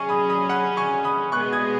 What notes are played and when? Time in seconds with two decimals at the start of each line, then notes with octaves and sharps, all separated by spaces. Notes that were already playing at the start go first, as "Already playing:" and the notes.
Already playing: F#3 C#4 G#4 G#5 C#6
0.09 B5 D#6
0.29 B5 D#6
0.49 F#5 B5
0.77 G#5 C#6
1.04 B5 D#6
1.32 B2 G#3 B3 G#4 C#6 F#6
1.53 D#6 G#6